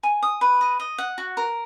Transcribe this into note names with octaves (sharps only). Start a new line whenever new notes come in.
G#5
D#6
B4
D#5
D#5
F#5
F#4
A#4